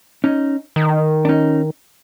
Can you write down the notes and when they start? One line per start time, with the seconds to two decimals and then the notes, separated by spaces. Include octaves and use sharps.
0.24 C#4 D#4
0.76 D#3
1.25 D4
1.29 C#4 D#4